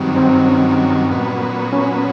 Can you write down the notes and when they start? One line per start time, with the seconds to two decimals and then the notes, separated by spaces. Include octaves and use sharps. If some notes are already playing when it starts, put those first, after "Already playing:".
Already playing: G2 D#3 F#3 C4
0.16 C4
0.47 C#4
1.11 A#2 F#3 B3
1.72 C#4